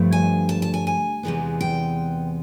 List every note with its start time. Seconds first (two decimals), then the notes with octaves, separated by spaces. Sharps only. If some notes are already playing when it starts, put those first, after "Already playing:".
Already playing: G2 D3 F3 A3
0.12 G#5
0.49 A5
0.62 A5
0.74 G#5
0.87 G#5
1.23 E2 C3 E3 G#3 B3
1.61 G5